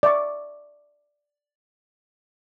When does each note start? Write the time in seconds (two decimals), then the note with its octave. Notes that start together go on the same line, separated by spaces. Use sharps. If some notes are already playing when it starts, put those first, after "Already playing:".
0.03 D5 E5 C#6